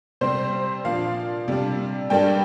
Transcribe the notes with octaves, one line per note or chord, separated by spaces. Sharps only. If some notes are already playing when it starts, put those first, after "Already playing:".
C3 G3 C4 C5
A#2 F3 D4 F5
C3 G3 D4
G2 G3 A#3 D4 G5